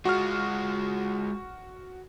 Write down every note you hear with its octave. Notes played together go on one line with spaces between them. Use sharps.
G#3 F4 F#4 C#6 F6